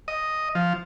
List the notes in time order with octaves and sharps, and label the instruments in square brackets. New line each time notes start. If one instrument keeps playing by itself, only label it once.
[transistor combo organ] D#5
F3